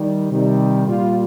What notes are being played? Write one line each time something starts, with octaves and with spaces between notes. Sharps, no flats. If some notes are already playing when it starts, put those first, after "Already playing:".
Already playing: D#3 G3
C3 D#3 G3
A#2 G3 F4